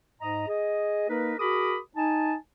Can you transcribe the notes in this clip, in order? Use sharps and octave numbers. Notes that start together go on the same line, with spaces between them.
G#2 D#5 A#5
G#4 D#5
A#3 D#4 A#4 B4
F#4 G#4 A#4 B5 D6 D#6
D#4 G#5 A5